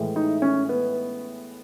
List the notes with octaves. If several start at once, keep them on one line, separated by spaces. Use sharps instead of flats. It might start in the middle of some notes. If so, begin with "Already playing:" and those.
Already playing: A2 E3 G#3
D#4
C#4
B3